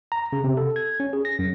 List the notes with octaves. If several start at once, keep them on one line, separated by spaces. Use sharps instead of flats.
A#5
C#3
C3
A4
G#6
C#4
G#4
A#6
F#2